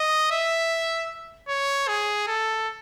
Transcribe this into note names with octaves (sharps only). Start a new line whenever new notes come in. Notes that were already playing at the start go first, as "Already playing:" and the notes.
Already playing: D#5
E5
C#5
G#4
A4